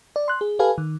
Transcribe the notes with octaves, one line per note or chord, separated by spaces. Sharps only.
D5
C6 F#6
G#4
G4 A4 B4 F5 G#5
D#3